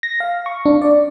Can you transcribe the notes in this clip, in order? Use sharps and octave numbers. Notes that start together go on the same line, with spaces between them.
A#6
F5
C#6
D4
D5